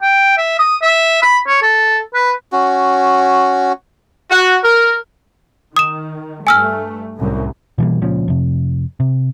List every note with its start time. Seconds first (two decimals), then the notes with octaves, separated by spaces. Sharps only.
0.02 G5
0.37 E5
0.59 D#6
0.82 E5
1.22 B5
1.47 C#5
1.62 A4
2.14 B4
2.52 C#4 F#4
4.30 F#4
4.64 A#4
5.76 D#3 D#6 E7
6.47 G2 A3 G#5 E6 F6
7.17 C2 F#2 A2
7.78 B2 E3 G3 A#3
8.02 C#2 A#2 F3 C#4
8.28 F2 C3
9.00 C3